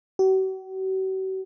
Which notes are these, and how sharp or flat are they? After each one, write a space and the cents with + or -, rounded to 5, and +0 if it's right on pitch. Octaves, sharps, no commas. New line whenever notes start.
F#4 +45